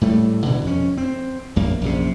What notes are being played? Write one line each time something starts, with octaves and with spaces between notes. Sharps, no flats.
A2 G3 A3
B2 D3 E3
F2 C#4
C4
A#1 F#2 A#3
A#1 F#2 C3